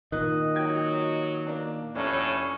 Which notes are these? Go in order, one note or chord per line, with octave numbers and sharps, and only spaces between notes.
A#2 D#3 D#5 F#6
F#3 G5 G#6
A#3 D4
F1 A2 C#4 D4